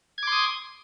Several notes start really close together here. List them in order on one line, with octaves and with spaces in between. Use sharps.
G#6 D6 C6 D#6